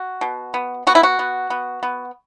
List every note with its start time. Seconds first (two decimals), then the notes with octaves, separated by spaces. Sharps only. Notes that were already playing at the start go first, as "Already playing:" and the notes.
Already playing: F#4
0.21 B2
0.54 B3
0.87 B3 F#4
0.95 E4
1.03 F#4
1.19 B3
1.50 B3
1.83 B3